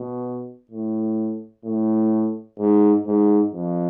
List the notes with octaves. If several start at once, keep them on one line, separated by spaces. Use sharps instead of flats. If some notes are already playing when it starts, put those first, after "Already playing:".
Already playing: B2
A2
A2
G#2
G#2
F2